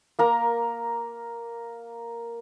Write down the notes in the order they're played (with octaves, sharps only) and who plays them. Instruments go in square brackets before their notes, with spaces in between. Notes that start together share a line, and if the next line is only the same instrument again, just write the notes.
[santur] A#3 A#4 A#5